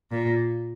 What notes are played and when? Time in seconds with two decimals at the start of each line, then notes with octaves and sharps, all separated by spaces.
0.11 A#2